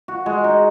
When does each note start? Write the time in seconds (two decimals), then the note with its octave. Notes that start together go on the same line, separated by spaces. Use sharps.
0.08 F#4
0.26 G#3
0.44 D#4